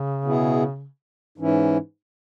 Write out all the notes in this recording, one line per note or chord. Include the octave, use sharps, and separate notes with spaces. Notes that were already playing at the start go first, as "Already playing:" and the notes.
Already playing: C#3
B2 B3 E4 G#4
G#2 E3 C#4 E4